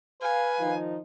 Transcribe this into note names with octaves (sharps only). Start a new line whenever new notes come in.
B4 F5 G#5
D#3 F3 D#4